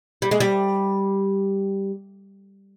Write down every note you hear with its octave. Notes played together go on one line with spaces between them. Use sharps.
G3
G#3
G3